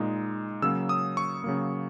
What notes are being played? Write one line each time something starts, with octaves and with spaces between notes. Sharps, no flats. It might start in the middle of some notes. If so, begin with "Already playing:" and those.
Already playing: A#2 G#3 D#4
C#3 F#3 A#3 E6
D#6
C#6
C#3 F#3 A#3